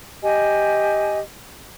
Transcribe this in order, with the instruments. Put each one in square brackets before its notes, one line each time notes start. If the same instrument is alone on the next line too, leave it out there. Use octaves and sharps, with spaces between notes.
[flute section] G4 D#5 G#5